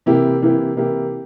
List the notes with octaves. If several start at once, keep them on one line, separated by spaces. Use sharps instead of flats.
C3 E3 A#3 E4 G4
C3 E3 A#3 E4 G4
C3 E3 A#3 E4 G4